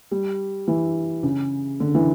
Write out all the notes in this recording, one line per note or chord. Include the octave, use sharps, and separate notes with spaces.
G3
E3
C#3
D3
E3